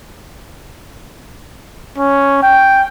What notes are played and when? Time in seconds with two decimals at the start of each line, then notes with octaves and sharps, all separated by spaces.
1.98 C#4
2.43 G5